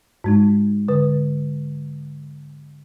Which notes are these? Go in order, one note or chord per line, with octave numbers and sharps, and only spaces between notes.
G#2 G#3 D#4
D3 B4